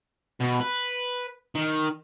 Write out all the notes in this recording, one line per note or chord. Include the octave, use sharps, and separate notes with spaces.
B2
B4
D#3